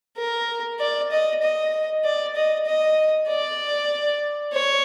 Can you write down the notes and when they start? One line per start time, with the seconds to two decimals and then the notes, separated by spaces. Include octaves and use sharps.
0.18 A#4
0.79 D5
1.12 D#5
1.42 D#5
2.04 D5
2.36 D#5
2.66 D#5
3.28 D5
4.53 C#5